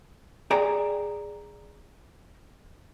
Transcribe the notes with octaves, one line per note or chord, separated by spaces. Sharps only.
G#4 D5 G5 A#5